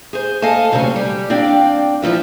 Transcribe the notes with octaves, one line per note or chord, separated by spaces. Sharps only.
G#4 C5
A4 D#5 F5 G#5 A5
D2 C3 F#3 C#4 G#5
G3
C4 D4 D5 F5 G5
E3 F3 C4 F4 E5